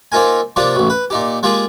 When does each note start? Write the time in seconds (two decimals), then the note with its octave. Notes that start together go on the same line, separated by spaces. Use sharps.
0.12 A#3 C4 D#4 F4 A#4 G#5
0.56 C3 F3 A#3 D4 F4
0.76 A1 B2
0.90 B4
1.10 A#2 D#4 G4
1.43 G#3 A#3 F4 G4 G#4